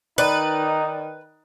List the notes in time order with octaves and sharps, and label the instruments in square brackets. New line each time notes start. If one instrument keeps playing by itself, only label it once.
[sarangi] D#3 [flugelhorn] D#4 [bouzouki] B4 [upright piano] D5